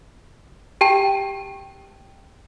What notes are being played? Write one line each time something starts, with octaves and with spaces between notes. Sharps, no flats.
G4 G5 A5 D#7